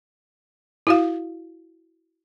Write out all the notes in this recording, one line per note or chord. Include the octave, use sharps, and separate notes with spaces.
E4 F#4 F5